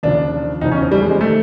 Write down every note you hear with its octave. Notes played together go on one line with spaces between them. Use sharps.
D#2 C#3 F3 D4
E2 C#3 F3 D#4
C#4
C4
G3
G#3
G#3
D#3 A3